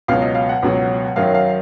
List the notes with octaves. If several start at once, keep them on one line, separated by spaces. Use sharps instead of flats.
C#2 B2 F#3 F5
D#5
F5
F#5
C#2 B2 F#3
F#2 D#3 F#3 F5
F5